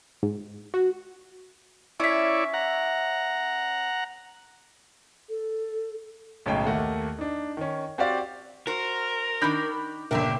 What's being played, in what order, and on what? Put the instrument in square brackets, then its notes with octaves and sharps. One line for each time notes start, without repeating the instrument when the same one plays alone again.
[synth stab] G#2
F#4
[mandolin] C#4 E5 [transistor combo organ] E4 C#5 D5
[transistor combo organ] F#5 A#5
[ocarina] A4
[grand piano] B1 A2 C#3 G#3 C#5 G5
D#2 A3 A#3 F#5
D4 D#4
D#3 C#4
C4 F#4 G4 C5 D5 F5
[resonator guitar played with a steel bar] F#4 C5 [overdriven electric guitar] A#4
[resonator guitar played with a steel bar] D#3 D4 [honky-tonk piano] B5 G6 A#6
[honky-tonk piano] G1 A#4 [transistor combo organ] A#2 C#3 G5 [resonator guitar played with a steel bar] D4 E5